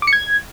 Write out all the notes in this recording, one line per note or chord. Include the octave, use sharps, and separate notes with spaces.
D6
C#7
G#6